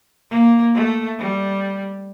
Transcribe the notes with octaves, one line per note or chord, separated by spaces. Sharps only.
A#3
A3
G3